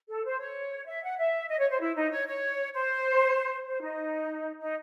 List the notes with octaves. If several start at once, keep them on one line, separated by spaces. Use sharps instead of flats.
A4
C5
C#5
E5
F#5
E5
D#5
C#5
C5
E4
D#4
C#5
C#5
C5
C5
D#4
D#4